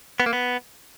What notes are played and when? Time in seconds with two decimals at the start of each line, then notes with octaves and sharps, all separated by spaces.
0.20 B3
0.26 A#3
0.33 B3